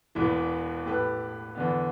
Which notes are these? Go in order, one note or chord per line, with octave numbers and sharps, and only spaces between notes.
E1 E2 E3
A2 A3 G4 B4
E2 D3 B3